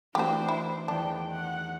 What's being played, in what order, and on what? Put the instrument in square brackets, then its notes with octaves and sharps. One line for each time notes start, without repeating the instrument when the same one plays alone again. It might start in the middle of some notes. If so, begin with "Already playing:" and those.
[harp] E3 A3 F#4 [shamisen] C4 G4 [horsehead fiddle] D4 C5
[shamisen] E4
[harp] E2 D#3 [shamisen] D4 [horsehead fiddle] G5
[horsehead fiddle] F#5